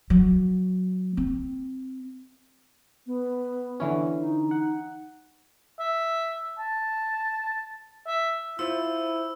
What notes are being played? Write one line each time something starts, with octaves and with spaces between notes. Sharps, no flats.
F#3
C4
B3
D3 E3 C#4
D#4
F#5
E5
A5
E5
E4 F4 C5 E6